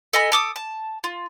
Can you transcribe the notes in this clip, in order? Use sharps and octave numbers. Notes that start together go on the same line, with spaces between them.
A4 D#5 G#5 B5
A4 D6 D#6
A5
F4